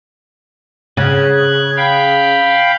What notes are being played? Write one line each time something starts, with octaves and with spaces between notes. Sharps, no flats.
C#3 F#6 G#6
F5 G5 B5